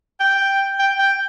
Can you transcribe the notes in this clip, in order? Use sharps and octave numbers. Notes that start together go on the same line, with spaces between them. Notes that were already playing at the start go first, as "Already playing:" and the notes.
G5
G5
G5